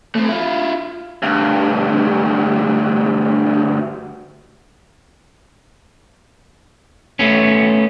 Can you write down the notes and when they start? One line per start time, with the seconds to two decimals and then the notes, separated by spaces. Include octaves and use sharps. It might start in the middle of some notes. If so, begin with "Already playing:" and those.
0.15 A3 C4
0.29 E4 F4
1.23 D2 G2
7.19 A3 B3 C#4